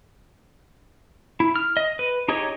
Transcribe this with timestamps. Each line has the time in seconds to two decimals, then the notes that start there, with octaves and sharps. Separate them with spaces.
1.40 E4
1.56 F6
1.77 D#5
1.99 B4
2.28 D#4 G4 G#4 C#5 D#5